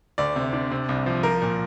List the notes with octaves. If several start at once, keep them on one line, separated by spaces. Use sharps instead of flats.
D2 D5
C3
D4
C3
C2
F3
F3 A#4
A#2